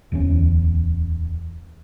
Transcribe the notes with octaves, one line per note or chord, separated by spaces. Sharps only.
D1 E2 B3 C#4